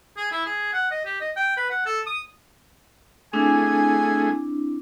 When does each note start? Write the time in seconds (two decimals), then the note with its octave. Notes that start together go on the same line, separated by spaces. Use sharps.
0.17 G#4
0.31 E4
0.46 G#4
0.73 F#5
0.91 D#5
1.05 G4
1.20 D#5
1.36 G5
1.57 B4
1.70 F#5
1.86 A4
2.07 D#6
3.33 A3 C4 D4 E4 G#4 G#5